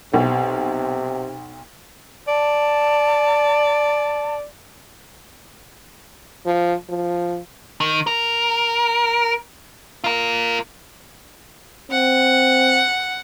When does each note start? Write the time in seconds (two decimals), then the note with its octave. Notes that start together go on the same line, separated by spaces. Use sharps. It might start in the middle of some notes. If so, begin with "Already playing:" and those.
0.14 B1 C3
2.28 D5 A5
6.46 F3
6.89 F3
7.80 D#3
8.07 A#4
10.04 F4 A#4
11.91 C4 F#5